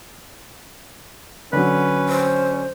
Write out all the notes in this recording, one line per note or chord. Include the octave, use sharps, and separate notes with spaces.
D3 F#3 C#4 B4
C5